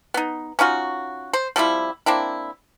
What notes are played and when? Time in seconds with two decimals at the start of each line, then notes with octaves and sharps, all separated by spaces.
0.14 B3 D#4
0.59 C#4 D#4 F4 F#4
1.33 C5
1.56 F3 G3 C4 E4
2.06 A#3 C4 D4 E4